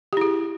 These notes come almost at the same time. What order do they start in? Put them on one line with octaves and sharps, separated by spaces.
G4 E4 G#4